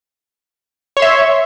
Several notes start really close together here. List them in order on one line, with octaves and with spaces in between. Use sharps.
C#5 C6 E5